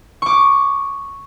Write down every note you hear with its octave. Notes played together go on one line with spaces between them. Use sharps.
C#6 D6